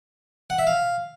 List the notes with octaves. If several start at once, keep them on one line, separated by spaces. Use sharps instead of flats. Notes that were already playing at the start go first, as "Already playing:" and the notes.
F#5
E5
F5